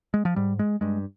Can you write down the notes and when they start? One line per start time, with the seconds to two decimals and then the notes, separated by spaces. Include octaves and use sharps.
0.14 G#3
0.25 F3
0.36 G#2 G3
0.59 G#3
0.81 G2 G#3